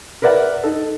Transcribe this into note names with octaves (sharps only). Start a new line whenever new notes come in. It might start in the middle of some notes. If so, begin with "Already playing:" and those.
A#4 B4 D5 E5 F#5
D#4 A4